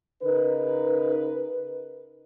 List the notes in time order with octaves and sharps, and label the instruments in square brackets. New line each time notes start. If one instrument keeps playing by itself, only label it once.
[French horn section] C#3 D#4 A#4 B4